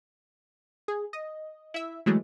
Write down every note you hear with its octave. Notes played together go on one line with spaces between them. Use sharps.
G#4
D#5
E4 E5
E3 F#3 G#3 A3